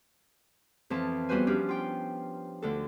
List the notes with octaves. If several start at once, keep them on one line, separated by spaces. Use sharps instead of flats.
F2 E3 F3 A5
E2 G3 F#4 B4 C5 G#5
F3 C#4 D4 G4
F4 G5
D2 D3 A4